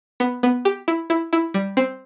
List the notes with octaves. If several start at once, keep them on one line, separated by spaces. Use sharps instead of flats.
B3
B3
G4
E4
E4
E4
G3
C4